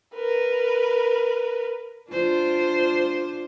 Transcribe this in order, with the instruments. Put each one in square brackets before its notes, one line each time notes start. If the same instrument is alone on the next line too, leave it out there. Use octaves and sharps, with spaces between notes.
[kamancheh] A#4 B4
[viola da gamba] D4 F4 C5